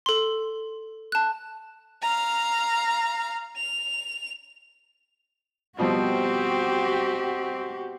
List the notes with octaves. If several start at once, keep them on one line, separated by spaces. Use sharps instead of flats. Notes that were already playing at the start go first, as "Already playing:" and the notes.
A4 C6
A5 F#6
F5 A#5
F7
B2 F3 G3 C4 F#4 G4